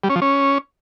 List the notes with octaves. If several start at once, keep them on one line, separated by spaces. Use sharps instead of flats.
G3
C#4
F3
C#4